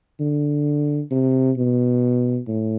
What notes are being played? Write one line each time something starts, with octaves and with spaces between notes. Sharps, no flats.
D3
C3
B2
A2